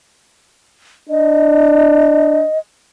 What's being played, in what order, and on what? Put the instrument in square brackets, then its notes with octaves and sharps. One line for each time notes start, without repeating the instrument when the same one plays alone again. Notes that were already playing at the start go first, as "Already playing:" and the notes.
[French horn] D4 [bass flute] D#5